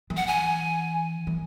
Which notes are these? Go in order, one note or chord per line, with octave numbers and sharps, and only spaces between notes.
E3
F#5
G#5
E3